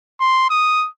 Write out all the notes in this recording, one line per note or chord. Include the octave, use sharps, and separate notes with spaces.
C6
D#6